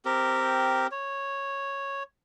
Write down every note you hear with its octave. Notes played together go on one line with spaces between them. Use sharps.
C4 G4 A#4
C#5